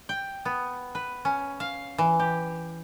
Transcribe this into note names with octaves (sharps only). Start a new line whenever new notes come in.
G5
B3
B4
C#4
F5
E3
G4